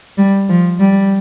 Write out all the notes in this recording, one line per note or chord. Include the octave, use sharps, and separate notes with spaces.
G3
F3
G3